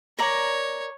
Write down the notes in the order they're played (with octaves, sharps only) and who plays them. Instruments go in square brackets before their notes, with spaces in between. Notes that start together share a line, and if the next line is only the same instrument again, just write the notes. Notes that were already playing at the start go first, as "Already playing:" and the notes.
[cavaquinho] A#4 D5 A#5 [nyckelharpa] C#5